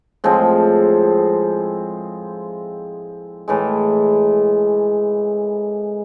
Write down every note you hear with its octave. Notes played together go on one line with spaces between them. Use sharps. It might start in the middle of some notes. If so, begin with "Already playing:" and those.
A2 F3 G#3 C4
A2 E3 G#3